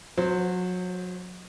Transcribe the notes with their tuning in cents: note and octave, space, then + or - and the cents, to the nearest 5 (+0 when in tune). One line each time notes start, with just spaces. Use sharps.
F#3 -30 C5 +0